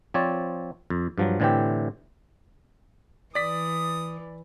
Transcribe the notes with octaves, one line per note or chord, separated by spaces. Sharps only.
F3 C4 C#5 D5
F2
G2 F3 F#3
A2 D3 E3 C4 G4
E3 D5 D#6 B6